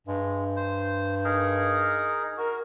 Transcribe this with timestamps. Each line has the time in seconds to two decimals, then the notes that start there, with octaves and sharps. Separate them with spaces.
0.07 G2 G#3
0.56 C5
1.25 D#4 G#4 A#4
2.37 F#4 A#4